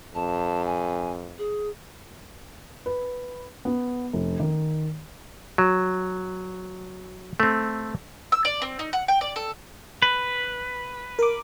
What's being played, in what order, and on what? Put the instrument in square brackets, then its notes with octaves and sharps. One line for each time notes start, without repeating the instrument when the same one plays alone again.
[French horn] F2 [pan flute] A5
[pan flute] G#5
G#4
[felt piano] B4
B3
F1
D#3
[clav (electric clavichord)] F#3
A3 C4
[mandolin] E6
D5
C4
D#4
F#5
G5
D5
A4
[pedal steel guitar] B4
[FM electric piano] A#4 D6